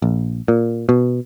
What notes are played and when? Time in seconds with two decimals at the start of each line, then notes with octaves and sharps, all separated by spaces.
0.02 A#1
0.48 A#2
0.89 B2